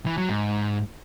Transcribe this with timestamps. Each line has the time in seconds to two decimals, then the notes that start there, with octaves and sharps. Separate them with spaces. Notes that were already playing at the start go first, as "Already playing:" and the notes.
0.06 E3
0.18 F#3
0.29 G#2